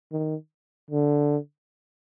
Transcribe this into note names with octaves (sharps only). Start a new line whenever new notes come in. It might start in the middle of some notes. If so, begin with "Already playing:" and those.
D#3
D3